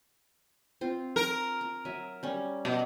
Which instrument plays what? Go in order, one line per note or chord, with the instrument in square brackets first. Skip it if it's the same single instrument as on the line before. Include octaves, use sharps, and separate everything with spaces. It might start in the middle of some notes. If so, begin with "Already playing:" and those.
[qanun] C4 F4
[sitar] A#4
[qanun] A#5
F#3 E5 G#5
G3 C#4
[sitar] B2